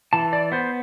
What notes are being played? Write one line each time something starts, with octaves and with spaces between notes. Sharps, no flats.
E3 A5
D5
B3 C5